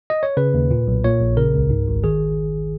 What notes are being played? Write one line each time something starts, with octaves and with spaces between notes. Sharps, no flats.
D#5
C#5
C#3 B4
D#2
A#2
B1
A#2 C#5
A#1
C#3 A#4
C#2
G#2
G#1
D#3 G#4